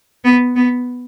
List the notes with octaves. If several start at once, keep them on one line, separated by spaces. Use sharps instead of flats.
B3
B3